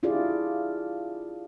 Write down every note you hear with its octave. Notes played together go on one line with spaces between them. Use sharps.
D4 E4 F4 G4 G#4 D5